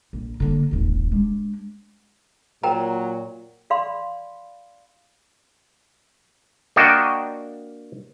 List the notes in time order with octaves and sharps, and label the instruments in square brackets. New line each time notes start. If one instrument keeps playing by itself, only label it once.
[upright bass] A#1
D3 A#3
D#1 G#1
G#3 D4
[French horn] A#2 [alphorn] F#3 [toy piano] A#4 G5 A#5
[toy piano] D5 F5 B5 C6
[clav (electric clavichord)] A#3 D4 F#4 D#5 G5 A5